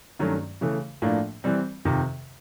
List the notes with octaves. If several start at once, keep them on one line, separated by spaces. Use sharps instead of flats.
G2 D#3 F#3 A3 C#4
C#3 E3 A3
A2 F3 A#3 D4
E3 G3 C4
F2 C3 D#3